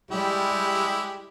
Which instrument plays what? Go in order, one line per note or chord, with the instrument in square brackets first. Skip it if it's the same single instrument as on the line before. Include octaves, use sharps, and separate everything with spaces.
[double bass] G3 [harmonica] G#3 E4 G4